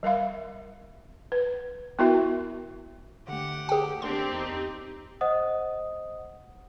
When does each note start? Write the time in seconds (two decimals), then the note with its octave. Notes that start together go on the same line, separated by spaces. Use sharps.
0.03 G3 A#4 E5 F5
1.32 B4
1.99 B3 E4 F#4 A#4 E5
3.28 D3 A3 G4 F#5
3.69 G4 G#4 G5
4.02 A3 C4 D4 G4 A#4 C6
4.32 E2 D#4
5.21 C5 D#5 F#5 D#6